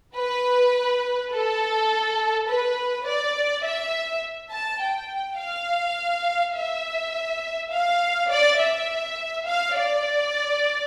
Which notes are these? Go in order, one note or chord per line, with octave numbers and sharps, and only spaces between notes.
B4
A4
B4
D5
E5
A5
G5
F5
E5
F5
D5
E5
F5
D5